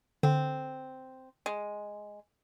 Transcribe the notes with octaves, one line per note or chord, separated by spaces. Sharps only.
D3 C4
G#3